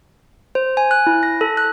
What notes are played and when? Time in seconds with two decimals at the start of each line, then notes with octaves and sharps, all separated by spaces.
0.55 C5
0.77 G#5
0.91 F#6
1.07 E4
1.23 A#6
1.41 A4
1.57 F#6